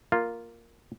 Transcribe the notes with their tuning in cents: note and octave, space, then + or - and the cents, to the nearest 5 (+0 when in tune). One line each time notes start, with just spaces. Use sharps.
A#3 -5 F4 +0